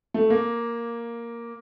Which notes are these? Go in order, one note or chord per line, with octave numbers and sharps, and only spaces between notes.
A3
A#3